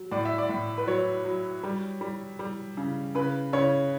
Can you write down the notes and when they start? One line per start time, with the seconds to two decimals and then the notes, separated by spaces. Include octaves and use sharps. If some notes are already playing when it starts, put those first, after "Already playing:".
Already playing: F#3
0.12 A2 D5
0.25 E5
0.38 D5
0.49 A2
0.78 B4
0.87 F#3 C#5
1.25 F#3
1.64 G3
2.01 G3
2.39 G3
2.77 C#3
3.15 C#3 B4
3.53 C#3 C#5